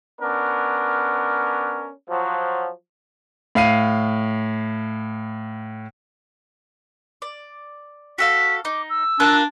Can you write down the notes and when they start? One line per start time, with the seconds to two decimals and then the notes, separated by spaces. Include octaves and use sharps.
0.20 B3 C#4 D4 A#4
2.08 F3 F#3
3.55 A2 F5 C7 D#7
7.22 D5
8.18 F#4 A4 F5 B6
8.65 D#4 D6
8.90 E6
9.20 D4 F4 A#4 F#6